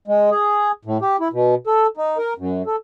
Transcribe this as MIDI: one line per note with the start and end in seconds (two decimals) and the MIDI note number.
0.08 0.30 56
0.31 0.72 68
0.85 0.97 45
1.02 1.16 67
1.20 1.28 64
1.33 1.55 47
1.67 1.87 69
1.97 2.18 63
2.18 2.33 70
2.38 2.62 42
2.66 2.76 69